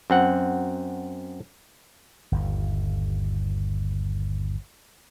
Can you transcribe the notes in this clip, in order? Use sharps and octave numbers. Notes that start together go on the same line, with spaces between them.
F#2 C4 F#5
G1 D#2